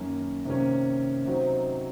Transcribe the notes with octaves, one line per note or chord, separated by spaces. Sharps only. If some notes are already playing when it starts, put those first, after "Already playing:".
Already playing: F#2 D#3 A#3 C#4
C3 D#3 A#3 C#4
C3 F#3 C4 D#4